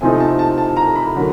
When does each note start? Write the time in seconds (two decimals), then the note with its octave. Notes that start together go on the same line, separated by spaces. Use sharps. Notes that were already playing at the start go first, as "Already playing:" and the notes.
0.01 C3 F3 A3 C4 D#4 G#5
0.20 A5
0.39 A5
0.58 A5
0.77 A#5
0.96 B5
1.16 D3 F#3 A#3